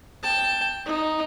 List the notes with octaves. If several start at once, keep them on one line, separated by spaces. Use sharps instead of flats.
G5 A5
D#4